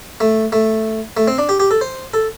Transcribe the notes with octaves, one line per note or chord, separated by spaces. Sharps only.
A3
A3
A3
C4
D4
G4
G4
A4
C5
A4